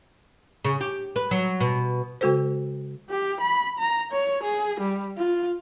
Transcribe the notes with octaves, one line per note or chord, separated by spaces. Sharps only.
C#3
G4
B4
F#3
B2
C#3 G#3 F#4 A4 C5
G4
B5
A#5
C#5
G#4
G3
F4